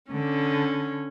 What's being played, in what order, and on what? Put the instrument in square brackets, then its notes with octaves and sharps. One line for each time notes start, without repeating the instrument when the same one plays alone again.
[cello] D3 [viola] C#4